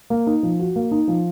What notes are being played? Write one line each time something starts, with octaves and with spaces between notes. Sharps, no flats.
A#3
D#4
F3
F#4
A#3
D#4
F3